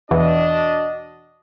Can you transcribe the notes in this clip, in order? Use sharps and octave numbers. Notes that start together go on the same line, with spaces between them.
E2 B2 E3 D4 F#4 D#5